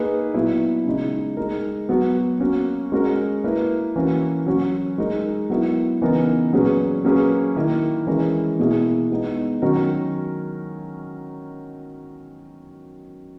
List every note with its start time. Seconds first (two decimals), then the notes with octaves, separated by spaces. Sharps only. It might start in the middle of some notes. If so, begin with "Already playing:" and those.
Already playing: A#3 D#4 G#4 B4
0.34 A#2 F#3 B3 E4
0.85 C#3 G#3 D#4
1.37 G#3 D#4 A#4
1.89 F#3 B3 F#4
2.40 A#3 C#4 F#4
2.92 G#3 C#4 F#4 A#4
3.44 A#3 E4 B4
3.96 E3 A#3 C#4 F#4 A#4
4.46 F#3 C#4 F#4
4.98 G#3 D#4 A#4
5.50 F#3 B3 E4 A#4
6.02 C#3 E3 B3 D#4 A#4
6.53 A#2 F#3 C#4 G#4 B4
7.04 F#3 A#3 C#4 G#4 B4
7.56 D#3 A#3 E4 A#4
8.07 E3 G#3 C#4 E4 A#4
8.59 B2 A#3 E4 G#4
9.11 G#3 B3 D#4
9.62 D#3 F#3 C#4 F#4 A#4